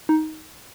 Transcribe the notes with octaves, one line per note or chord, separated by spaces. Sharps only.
D#4